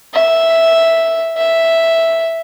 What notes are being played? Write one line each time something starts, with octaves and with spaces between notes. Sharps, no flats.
E5
E5